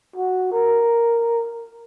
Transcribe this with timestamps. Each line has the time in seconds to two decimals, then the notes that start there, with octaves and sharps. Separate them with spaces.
0.16 F#4
0.52 A#4